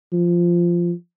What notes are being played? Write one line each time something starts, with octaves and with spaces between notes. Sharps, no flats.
F3